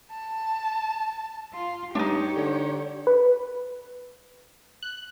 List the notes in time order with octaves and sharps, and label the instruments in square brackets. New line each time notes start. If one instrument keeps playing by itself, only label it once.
[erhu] A5
[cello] F4
[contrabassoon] G2 [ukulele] D4 D#4 [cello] G4 C#5
[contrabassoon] D3
[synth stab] B4
F#6